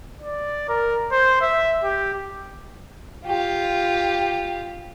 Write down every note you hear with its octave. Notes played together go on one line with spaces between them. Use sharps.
D5
A#4
C5
E5
G4
F4 G4